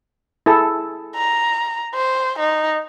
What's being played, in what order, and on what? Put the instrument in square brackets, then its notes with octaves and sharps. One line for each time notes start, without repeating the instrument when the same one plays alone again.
[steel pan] E4 G#4 A4
[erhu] A#5
C5
D#4